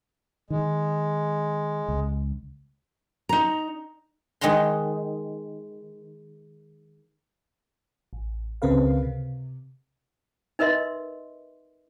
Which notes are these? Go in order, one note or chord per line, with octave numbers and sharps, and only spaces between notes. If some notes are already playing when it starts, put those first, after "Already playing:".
D#3 G#3
C#2
D#4 A#5
D#3 G#3 F#5 A#5 C6
A1
C#2 C#3 C4 A#4 B4 F5
C3
D#4 A#4 B4 D#5 E5 C6